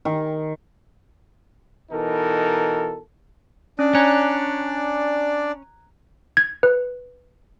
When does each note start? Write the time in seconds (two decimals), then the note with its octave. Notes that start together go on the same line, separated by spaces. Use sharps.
0.05 D#3
1.91 B2 E3 D#4 A4 A#4
3.79 C#4 D4 D5
3.95 C#4 A#5 F#6 G#6
6.37 G#6
6.63 B4